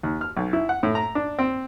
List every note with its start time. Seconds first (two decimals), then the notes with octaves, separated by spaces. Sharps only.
0.03 D#2
0.21 F6
0.37 B1
0.53 E4
0.69 F#5
0.83 A2
0.95 A#5
1.15 D4
1.39 C4